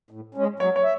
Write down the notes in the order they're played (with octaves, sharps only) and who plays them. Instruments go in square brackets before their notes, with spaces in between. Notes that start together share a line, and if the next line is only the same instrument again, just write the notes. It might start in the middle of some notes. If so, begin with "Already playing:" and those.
[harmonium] A2
G#3 C#4
[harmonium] F#3 [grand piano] C#5
[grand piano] C#5
[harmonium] E5